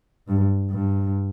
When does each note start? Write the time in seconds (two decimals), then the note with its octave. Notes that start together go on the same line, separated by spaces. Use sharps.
0.28 G2
0.71 G2